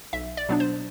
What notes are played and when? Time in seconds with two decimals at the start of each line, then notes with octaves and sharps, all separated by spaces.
0.13 B1 E5
0.37 D5
0.49 B2 F#3 B3 D4
0.60 C5